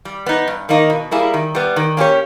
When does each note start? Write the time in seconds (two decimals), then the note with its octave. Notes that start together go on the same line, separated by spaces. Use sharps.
0.05 G3
0.26 B3 D#4
0.48 G2
0.69 D#3 A#3 D#4
0.90 B2
1.11 G3 A#3 E4 G#4
1.34 D#3
1.55 G3 B3
1.76 D#3
1.97 A#3 C#4 G4 C#5